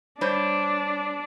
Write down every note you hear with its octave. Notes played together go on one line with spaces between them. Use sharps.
G3 D4 C5 C#5